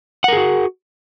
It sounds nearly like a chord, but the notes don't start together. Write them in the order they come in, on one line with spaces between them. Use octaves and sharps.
F#5 A#4 G#4 F#4